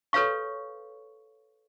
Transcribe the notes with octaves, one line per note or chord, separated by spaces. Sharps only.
A4 B4 C#5 F5 C#6